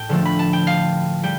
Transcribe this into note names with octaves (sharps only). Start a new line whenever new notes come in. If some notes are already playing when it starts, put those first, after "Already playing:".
Already playing: A2 G5 A5
D3 F3 A3
B5
A5
G5
F5
G3 G5